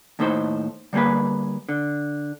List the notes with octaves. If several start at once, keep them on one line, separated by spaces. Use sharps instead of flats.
D#2 A2 D#4 A4 C5
D3 G3 A#3 G#4 B4
D3